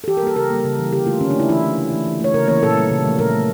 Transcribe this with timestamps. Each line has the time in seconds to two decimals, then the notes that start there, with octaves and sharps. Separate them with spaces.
0.04 A4
0.08 E3 G4
0.17 A#4
0.22 G3 A#3 A4
0.36 C#3 A#4
0.50 G3 A#3
0.65 C#3
0.79 E3 G3
0.92 D3 G4
1.06 A3 F4
1.21 D3 C#4
1.31 D4
1.36 A3 E4
1.49 E3 E4
1.63 A3
1.78 C#3
1.92 E3 A3
2.07 E3
2.20 A3 C#5
2.34 C#3 A#4
2.48 E3 A#3 C#5
2.62 A#2 A4
2.77 G3 A#3
2.91 C#3
3.05 F3 A3
3.19 A#2 A#4
3.33 A3